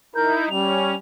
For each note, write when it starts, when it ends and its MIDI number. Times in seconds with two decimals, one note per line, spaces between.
0.15 0.49 63
0.15 0.49 64
0.15 0.38 70
0.15 0.46 91
0.50 0.98 55
0.50 0.95 61
0.50 0.96 101